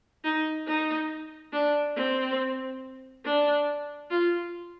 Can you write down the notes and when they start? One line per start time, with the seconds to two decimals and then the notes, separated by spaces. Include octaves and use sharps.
0.25 D#4
0.67 D#4
1.53 D4
1.96 C4
3.25 D4
4.11 F4